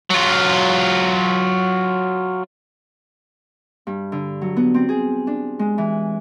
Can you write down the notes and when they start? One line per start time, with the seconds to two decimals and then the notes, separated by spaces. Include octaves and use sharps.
0.11 F#3 F4
3.87 G2
4.12 D3
4.42 F#3
4.57 B3
4.74 C4
4.89 G#4
5.27 D4
5.59 G#3
5.78 E3